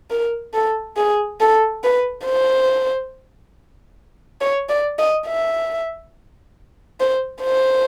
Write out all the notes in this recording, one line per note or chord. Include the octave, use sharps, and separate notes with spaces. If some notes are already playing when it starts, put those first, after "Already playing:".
A#4
A4
G#4
A4
B4
C5
C#5
D5
D#5
E5
C5
C5